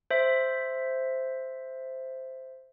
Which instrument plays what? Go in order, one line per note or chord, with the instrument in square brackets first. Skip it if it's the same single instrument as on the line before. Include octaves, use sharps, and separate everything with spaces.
[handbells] C5 E5